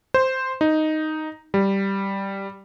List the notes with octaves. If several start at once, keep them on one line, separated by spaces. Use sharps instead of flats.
C5
D#4
G3